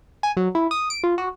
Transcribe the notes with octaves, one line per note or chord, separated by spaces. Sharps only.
G#5
F#3
E4
D#6
D7
F4
F#4